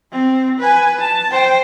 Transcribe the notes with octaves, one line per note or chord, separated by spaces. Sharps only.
C4
B4 G#5
A5
C5 G5